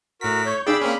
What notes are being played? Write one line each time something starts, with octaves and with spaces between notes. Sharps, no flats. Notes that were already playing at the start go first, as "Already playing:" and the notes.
A2 F#4 A#4 B6
C#5 G6
D4 G#4 D5 G5 B5 E6
A#3 C4 C#4